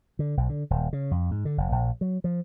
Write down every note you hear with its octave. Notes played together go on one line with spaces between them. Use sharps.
D3
B1
D3
D#1
C#3
F2
G#2
D3
F1
A#1
F#3
F3